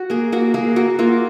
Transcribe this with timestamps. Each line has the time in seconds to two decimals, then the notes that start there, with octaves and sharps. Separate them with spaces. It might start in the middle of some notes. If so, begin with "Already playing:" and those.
Already playing: F#4
0.10 A#3 G#4
0.32 A#3 F#4
0.54 A#3 G#4
0.76 A#3 F#4
0.99 A#3 F4